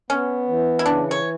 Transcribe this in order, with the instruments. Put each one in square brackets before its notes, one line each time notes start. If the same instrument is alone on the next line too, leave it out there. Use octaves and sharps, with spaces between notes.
[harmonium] B3 [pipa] C#4
[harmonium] E3
[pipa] E4
[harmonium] C#3 [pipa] D4
[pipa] C#5